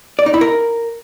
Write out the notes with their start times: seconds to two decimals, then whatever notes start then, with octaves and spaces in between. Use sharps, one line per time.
0.19 D5
0.26 D#4
0.34 E4
0.41 A#4